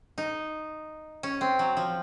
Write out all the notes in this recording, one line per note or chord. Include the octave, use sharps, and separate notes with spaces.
D#4
C#4
C4
F#3
F3